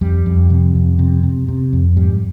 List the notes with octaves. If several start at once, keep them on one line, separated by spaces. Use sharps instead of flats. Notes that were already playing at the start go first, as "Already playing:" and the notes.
F2 G3
F2
C3
F2
C3
C3
C3
F2
G#2 G3